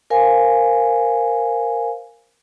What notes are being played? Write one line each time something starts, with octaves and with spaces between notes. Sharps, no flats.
A#4 C5 F5 G#5